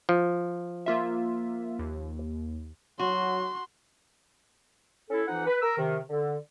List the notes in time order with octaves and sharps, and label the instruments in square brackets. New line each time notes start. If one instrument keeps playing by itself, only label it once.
[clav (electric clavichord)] F3
[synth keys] A#3 F4 E5
D#2
[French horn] F#3 [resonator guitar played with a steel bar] F#4 [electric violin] C6
[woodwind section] C#4 E4 A4
F2 E3 D#4 F#5
B4
A#4 E6
C3 D#3
D3